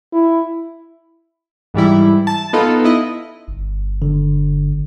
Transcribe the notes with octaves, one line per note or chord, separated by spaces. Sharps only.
E4
G#2 E3 G3 E4
A5
B3 D#4 F4 A4
E4 D#5
G1
D3